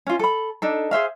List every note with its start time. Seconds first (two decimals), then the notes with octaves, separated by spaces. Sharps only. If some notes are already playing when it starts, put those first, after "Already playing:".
0.07 C#4 F4
0.19 A4 B5
0.62 D4 D#4 A4
0.91 G#4 C5 E5 F5